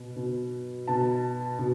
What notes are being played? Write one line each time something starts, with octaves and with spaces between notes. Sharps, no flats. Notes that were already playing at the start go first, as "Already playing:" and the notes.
Already playing: B2
B2
B2 A5
B2